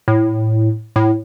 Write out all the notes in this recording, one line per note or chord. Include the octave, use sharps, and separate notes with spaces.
A2
A2